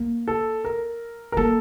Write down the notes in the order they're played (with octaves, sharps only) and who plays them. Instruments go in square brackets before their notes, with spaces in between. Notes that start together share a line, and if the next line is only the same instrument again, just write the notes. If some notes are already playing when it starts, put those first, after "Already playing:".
Already playing: [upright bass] A#3
[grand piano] A4
A#4
A#4
[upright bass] A#3 [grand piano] A4